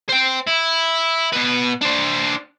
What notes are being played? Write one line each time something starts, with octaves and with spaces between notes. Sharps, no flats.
C5 G5
E4
B2 B4
D4 C5